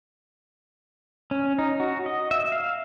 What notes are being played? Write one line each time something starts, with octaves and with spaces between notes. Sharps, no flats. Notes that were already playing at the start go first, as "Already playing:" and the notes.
C#4
D#4
F#4
D#5
E5
F5